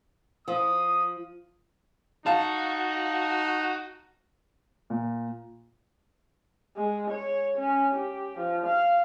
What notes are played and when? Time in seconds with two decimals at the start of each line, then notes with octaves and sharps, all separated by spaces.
0.48 F3 D#6
2.26 D#4 F#4 F5 A5
4.90 A#2
6.77 G#3
7.11 C#5
7.58 C#4
7.95 G4
8.38 F3
8.66 F5